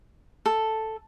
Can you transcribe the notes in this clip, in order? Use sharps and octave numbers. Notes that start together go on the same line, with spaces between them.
A4